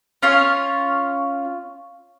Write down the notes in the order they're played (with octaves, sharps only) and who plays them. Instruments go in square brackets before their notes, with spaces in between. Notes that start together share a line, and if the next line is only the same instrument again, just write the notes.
[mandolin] C#4 F4 C#5